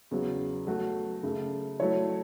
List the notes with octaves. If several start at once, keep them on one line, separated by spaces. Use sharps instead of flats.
E2 C#3 F#3
F#3 A3 F#4
F#2 C#3 A3
F#3 A3 E4 C#5